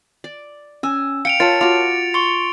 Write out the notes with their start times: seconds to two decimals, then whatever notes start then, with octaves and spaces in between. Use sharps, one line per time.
0.24 D5
0.83 C#4 G#5 E6
1.25 F5 G5 C#7 D7 F7
1.40 F4 A#4 C#5 A5 A6 C#7
1.61 F4 F#4 D6 F7
2.14 C6 C#6 C#7 G7